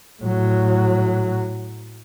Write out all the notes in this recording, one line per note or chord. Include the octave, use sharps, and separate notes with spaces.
A2 F#3